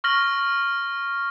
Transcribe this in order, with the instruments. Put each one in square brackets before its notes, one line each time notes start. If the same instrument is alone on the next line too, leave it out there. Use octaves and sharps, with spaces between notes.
[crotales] C#6 F6 A#6 F#7